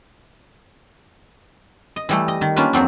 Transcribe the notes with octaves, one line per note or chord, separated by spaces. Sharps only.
D#5
E3 G3 A3
D#5
D#3
A#3 C#4 D4 F4 B4
F2 F#3 C4 D4